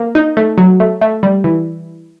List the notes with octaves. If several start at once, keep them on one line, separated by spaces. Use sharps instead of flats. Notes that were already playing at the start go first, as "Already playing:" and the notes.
Already playing: A#3
D#4
A3
F#3
A3
A3
G3
E3